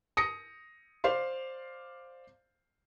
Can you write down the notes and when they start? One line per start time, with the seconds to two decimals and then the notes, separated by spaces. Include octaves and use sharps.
0.17 D#6 A#6 C#7
1.04 C5 D5 F5 C6